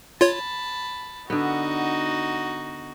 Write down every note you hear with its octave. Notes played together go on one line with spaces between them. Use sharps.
F4 C#5 A5 B5
D3 B3 D#4 F#4